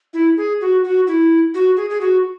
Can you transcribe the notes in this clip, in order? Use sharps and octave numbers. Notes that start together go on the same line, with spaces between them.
E4
G#4
F#4
F#4
E4
F#4
G#4
G#4
F#4